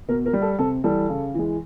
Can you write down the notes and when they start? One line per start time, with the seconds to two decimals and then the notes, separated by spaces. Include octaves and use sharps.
0.08 B2 A#4
0.26 A#4
0.33 G3
0.42 A4
0.58 C3 A4
0.84 E3 G3 A4
1.09 C#3
1.34 E3 G#3